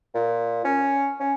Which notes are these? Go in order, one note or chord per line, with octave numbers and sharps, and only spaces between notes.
A#2
C#4
C#4